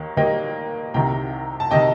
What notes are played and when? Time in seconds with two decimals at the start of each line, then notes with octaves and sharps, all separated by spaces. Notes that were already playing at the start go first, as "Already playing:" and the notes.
Already playing: D#2 D#3 A#3
0.17 D#2 D#3 G3 A#3 D#5 G5
0.94 C2 C3 D#3 G5 A#5
1.60 A5
1.71 C3 D#3 D#5 G5